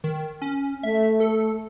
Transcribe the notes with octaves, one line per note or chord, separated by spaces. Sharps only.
D#3
C#4
A3 E5
A4